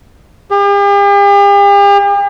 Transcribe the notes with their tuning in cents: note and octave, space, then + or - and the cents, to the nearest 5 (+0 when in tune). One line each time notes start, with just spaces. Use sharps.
G4 +45